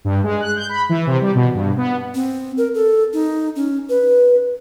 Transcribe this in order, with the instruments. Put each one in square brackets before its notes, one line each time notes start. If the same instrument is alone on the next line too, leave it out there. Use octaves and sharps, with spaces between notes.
[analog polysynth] G2
G#3
F#6
G6
B5
E3
C3
G3
B2
G2
B3
[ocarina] C4
A#4
A4
D#4
C#4
B4